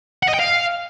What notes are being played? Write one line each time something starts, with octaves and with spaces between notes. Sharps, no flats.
F#5
D#5
G5
F5